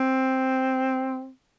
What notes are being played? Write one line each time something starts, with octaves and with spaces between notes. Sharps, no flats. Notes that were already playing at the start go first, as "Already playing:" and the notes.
Already playing: C4